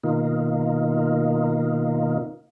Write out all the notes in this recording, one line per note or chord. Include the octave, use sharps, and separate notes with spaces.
B2 D#3 A#3 D#4 F4